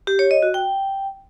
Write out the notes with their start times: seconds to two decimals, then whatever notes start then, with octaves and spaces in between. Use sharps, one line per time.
0.07 G4
0.19 C#5
0.31 D#5
0.43 F#4
0.54 G5